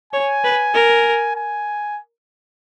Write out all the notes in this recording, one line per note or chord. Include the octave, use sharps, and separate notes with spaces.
C#5 G#5
B4
A#4
G#5